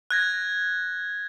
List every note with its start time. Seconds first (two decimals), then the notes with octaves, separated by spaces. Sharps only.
0.10 F#6 G#6 A#6